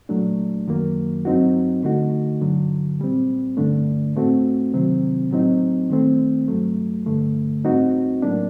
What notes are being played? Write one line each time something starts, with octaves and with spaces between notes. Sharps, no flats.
A#2 F#3 A3 D4
F#2 D#3 F#3 A#3
G2 F#3 C4 D#4 F#4
D3 A3 D#4 F#4
G2 D3 F#3
A#2 G3 C4
G2 D3 A3 D4
A2 A3 C4 F#4
C3 D#3 F#3 C4
A2 F#3 C4 D#4
D#3 A3 C4
G2 F#3 A3
G2 D3 A3
A2 G3 C4 D#4 F#4
A2 F#3 A#3 D4